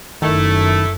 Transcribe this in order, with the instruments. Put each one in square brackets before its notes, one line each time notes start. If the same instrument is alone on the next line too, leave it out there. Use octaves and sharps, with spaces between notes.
[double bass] F#1 F#2 [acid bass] D#3 [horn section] A3 E4